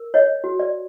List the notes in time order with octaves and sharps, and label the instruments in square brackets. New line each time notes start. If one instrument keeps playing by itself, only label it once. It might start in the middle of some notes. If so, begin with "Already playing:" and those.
Already playing: [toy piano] A#4
C#5 D#5
F#4
D5